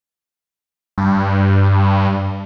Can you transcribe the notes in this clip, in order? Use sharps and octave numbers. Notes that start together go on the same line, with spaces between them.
G2